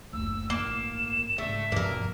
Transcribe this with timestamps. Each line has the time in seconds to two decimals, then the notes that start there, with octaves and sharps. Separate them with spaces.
0.13 F#1 D2 E6
0.50 A1 G2 A#3 E7
1.38 G#1 C#3 A3 E5
1.72 D#1 B1 G2 F3 A#3 A#4